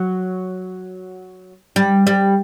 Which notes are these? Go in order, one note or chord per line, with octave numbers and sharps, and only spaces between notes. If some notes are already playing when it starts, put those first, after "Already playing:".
Already playing: F#3
G3
G3